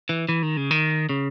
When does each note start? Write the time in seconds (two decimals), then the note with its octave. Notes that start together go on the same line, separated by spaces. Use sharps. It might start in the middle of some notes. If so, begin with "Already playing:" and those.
0.09 E3
0.29 E3
0.43 D#3
0.57 C#3
0.71 D#3
1.09 C#3